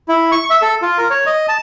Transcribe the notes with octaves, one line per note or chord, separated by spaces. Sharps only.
E4
C#6
E5
A4
F4
A#4
C#5
D#5
A5